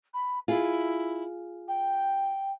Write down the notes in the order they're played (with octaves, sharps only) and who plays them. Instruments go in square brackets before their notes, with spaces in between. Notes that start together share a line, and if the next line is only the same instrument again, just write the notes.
[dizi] B5
[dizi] E4 [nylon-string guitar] F4 G#4
[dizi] G5